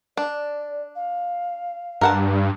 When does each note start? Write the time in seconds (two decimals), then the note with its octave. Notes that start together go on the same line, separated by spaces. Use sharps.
0.17 D4 D5
0.96 F5
2.01 G2 A#4 F#5 A5